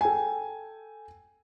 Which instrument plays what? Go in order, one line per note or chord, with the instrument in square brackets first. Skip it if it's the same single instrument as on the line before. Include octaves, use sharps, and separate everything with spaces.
[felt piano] A4 G5 G#5